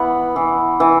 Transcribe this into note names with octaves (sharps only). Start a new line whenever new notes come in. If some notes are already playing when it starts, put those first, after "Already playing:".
Already playing: E3 B3 E4 F#5
E3
E3